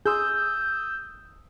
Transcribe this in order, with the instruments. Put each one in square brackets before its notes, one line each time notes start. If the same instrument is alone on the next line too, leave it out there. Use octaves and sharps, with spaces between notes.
[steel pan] G#4 C6 [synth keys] D#6 E6 G6